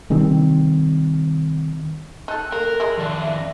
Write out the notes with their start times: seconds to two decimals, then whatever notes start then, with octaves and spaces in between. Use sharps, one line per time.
0.10 C3 D#3 G3 C4
2.28 D#4 A4 F#6
2.52 A#3 A4 A#4
2.80 G#3 E4 E5
2.98 F2 D#3 D5 A5
3.34 A#6